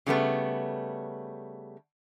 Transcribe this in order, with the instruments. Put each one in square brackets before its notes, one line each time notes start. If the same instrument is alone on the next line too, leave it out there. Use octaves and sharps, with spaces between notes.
[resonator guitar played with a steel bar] C#3 G3 A3 B3